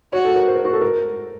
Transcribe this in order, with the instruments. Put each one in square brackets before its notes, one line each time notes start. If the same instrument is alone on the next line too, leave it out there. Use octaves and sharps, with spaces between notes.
[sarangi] F#4 [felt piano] C#5
[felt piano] A4
A#4
C5
A#4
F#4
A4
A#4